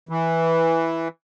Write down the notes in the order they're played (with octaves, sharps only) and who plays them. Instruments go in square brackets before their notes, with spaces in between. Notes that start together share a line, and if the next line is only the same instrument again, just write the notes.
[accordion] E3